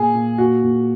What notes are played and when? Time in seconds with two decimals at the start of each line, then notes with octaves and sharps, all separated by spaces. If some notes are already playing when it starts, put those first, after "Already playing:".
Already playing: A#2 G#4
0.14 A#2
0.38 A#2 F#4
0.64 A#2